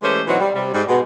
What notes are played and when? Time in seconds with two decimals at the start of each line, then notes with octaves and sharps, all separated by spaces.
0.03 E3 G#3 A3 C#4 G4 C5
0.27 B2 E3 F#3 C4 D#4 F#4
0.40 G3
0.55 C3 G3
0.73 G#2 G3
0.88 B2 G#3 B3